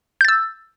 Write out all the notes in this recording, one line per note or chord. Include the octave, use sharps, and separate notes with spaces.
E6 G6 A6